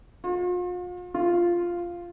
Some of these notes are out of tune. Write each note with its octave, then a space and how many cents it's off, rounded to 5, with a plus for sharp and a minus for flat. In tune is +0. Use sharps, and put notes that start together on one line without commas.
F4 +40
F4 -5